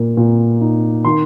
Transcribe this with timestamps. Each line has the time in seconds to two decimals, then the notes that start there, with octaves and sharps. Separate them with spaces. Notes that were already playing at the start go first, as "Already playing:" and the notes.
Already playing: A#2 A#3
0.17 A#2
0.61 D#4
1.05 D#3 C6